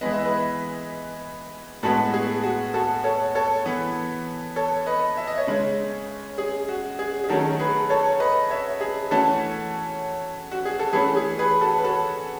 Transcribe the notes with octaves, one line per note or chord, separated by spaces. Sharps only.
E3 G#3 B3 D#5
E5
B4 D#5
A2 G#3 B3 F#4 A4
G#4
F#4
F#4 A4
A4 C#5
A4 C#5
E3 B3
A4 C#5
B4 D#5
E5
D#5
C#5 E5
C#3 G#3 C#4
G#4
F#4
G#4
G#4
D#3 F#3 A3 C#4 F#4 A4
G#4 B4
A4 C#5
B4 D#5
C#5 E5
G#4
E3 A3 C#4 F#4 A4
F#4
G#4
A4
E3 A3 C#4 G#4 B4
G#4
G#4 B4
F#4 A4
B4
F#4 A4